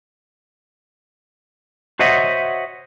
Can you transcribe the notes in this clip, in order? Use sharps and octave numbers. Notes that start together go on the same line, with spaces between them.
F#4 C5 C#5 D#5 E5 F#5